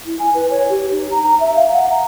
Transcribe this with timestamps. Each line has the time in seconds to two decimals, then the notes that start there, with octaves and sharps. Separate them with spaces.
0.06 E4
0.19 G#5
0.34 B4
0.50 C#5
0.69 G4
0.91 D#4
1.11 A#5
1.23 A#5
1.40 E5
1.55 F5
1.71 F#5
1.90 A#5